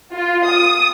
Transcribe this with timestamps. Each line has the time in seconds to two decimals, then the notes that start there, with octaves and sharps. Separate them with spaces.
0.14 F4
0.46 D#6